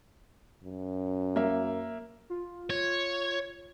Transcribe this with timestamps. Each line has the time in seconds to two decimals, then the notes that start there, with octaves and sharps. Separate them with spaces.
0.64 F#2
1.36 A#3 E5
2.30 F4
2.70 C#5